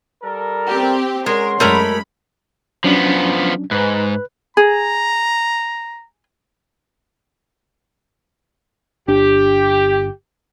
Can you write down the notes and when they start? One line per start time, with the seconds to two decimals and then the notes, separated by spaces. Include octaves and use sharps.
0.22 G3 A4 A#4
0.68 C4 G4
1.26 G#3 C#4 A#4 F#5 C6
1.60 F#2 G#3 A3 A#4 C#5 B5
2.84 F3 F#3 B3 C#4 D4
3.71 G#2 B4 B5 F#6
4.57 G#4 A#5
9.08 G1 D4 G4